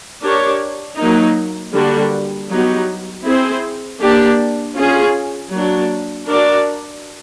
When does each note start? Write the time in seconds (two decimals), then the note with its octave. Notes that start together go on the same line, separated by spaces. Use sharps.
0.22 D4 G4 A#4 C#5
0.98 F#3 A#3 D#4
1.73 D3 G3 A#3 D4 F#4
2.50 F#3 B3 D#4 G4
3.25 C4 E4 G#4 C5
4.01 A#3 D4 G4
4.77 C#4 F4 G#4
5.53 F#3 A#3 D4
6.29 D4 F#4 A#4 D5